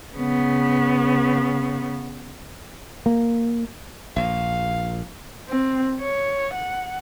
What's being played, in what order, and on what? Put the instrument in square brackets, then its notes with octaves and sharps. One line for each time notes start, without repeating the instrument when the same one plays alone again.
[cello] C#3 B3
[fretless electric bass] A#3
[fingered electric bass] A#1 [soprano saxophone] F5
[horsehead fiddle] C4
C#5
F#5